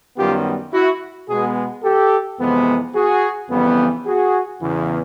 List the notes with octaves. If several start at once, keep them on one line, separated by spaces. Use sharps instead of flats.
F#2 D#3 G3 B3 F4 G4
E4 F#4
B2 G#3 B3 F#4 G#4
G4 A4
F2 C3 E3 G#3 B3
F#4 G#4
F2 C#3 E3 G3 B3
F#4 G#4
E2 C#3 E3